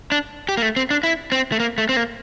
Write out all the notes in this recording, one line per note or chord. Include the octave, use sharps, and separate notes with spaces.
D4
G4
A#3
A3
C4
D4
E4
C4
A3
A#3
A3
C4
A#3